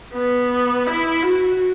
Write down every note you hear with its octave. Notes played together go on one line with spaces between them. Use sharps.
B3
E4
F#4